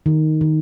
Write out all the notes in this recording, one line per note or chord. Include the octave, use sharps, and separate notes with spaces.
D#3
D#3